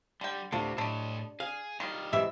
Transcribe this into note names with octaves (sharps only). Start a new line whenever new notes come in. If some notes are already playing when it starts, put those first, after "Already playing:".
D3 G3 G5
D2 A2 C3 D4 F4
A2 D4 G4 A4 D#5
G#4 F5
D#3 G3 F4 D#5
G#2 E3 G4 E5